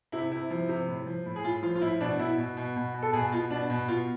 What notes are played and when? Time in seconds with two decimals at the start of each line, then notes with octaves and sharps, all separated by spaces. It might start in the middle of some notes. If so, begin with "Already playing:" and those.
0.12 C3 E4
0.31 C3 E4
0.50 F3
0.69 C3
0.87 A2
1.06 F3
1.26 A2
1.36 G#4
1.44 A2 F4
1.63 F3 F4
1.76 F4
1.81 A2 E4
2.00 B2 D4
2.19 B2 E4
2.38 B2
2.57 B2
2.76 B2
2.94 B2
3.02 A4
3.13 B2 G#4
3.32 B2 F4
3.51 B2 D4
3.70 B2
3.88 B2 F4